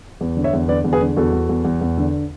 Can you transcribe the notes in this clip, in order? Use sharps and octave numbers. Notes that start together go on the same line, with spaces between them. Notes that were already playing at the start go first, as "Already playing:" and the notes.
E2
D3
C#5 E5
E2
D3 B4 D5
E2
G#4 B4
D3
E2 F#4 A4
E2
E2
E2
E2
D3